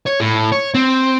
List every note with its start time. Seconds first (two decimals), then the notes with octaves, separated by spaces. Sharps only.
0.07 C#5
0.20 A2
0.52 C#5
0.75 C4